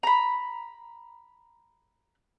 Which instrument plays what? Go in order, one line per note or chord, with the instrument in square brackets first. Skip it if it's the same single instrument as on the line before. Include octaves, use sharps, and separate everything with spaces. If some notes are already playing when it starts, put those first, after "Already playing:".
[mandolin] A#5 B5